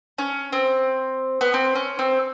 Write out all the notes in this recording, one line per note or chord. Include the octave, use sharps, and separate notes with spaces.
C#4
C4
B3
C4
C#4
C4